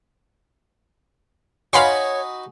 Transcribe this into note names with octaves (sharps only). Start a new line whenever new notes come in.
D#4 F#4 B4 C#5 F5 G#5 B5 C6